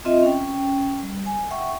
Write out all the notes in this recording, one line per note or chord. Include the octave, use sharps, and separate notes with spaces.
C4 F4 D#5 E5
C#4 G5
G3
G#5
E5 F#5 G5 C#6